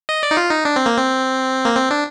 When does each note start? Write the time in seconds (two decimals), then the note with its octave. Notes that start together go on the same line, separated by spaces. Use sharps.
0.09 D#5
0.23 D5
0.31 D#4
0.37 F4
0.51 D#4
0.65 D4
0.76 C4
0.86 A#3
0.97 C4
1.65 A#3
1.76 C4
1.91 D4